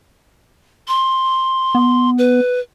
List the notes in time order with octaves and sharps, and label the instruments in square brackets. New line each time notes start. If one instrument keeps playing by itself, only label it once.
[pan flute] C6
[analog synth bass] B3
[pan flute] B4